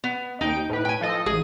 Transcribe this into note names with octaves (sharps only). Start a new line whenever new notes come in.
B3
D#2 D#4 G5 D7
A2 B4
G5 G#5
F3 A4 D#5
A1 G#4 D#7